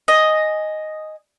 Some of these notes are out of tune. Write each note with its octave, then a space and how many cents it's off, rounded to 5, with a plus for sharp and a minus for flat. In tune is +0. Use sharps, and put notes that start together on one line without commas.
D#5 +0 G#5 +0